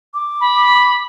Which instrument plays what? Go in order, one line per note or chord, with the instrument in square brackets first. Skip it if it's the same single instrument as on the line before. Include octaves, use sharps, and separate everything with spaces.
[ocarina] D6
[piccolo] B5